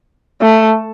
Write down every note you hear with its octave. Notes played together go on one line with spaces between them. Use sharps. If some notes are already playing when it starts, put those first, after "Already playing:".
A3